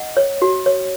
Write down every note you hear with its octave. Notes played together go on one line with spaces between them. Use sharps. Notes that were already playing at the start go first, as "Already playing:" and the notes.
Already playing: D#5 F#5
C#5
F#4
C#5